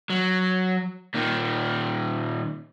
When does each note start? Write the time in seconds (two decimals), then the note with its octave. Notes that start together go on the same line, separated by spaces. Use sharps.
0.10 F#3
1.14 A#2 D#3